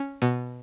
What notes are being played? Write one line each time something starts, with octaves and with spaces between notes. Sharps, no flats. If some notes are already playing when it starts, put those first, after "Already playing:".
Already playing: C#4
B2